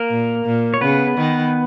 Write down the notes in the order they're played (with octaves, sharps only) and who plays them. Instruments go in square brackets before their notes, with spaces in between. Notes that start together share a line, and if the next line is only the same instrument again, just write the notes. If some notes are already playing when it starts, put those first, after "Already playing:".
Already playing: [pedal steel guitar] A#3 A#4
[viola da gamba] A#2
A#2
[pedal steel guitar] C#5
[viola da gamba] C#3 [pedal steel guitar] B3 B4
[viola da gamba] D#3